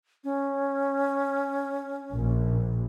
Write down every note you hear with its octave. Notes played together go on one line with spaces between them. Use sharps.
C#4
A#1